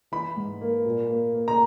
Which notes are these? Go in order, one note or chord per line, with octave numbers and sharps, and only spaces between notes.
E3 B5
G#2
A#3
A#2
A#3
A#3
A#5